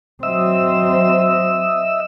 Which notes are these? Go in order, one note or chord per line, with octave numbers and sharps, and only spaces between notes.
F#3 C4 D#5 E5 E6